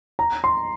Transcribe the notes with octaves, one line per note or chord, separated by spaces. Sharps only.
A#5
C6